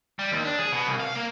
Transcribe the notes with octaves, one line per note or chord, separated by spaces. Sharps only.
G3
D#2
D4
G#4
B2
C2
F5
A#3